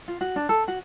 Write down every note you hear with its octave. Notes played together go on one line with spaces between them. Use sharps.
F4
F#4
D4
A4
F#4